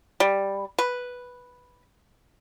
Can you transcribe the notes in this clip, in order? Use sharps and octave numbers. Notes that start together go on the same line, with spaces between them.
G3
B4